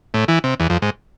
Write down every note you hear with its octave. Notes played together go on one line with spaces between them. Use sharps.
A2
E3
C3
E2
F2
G#2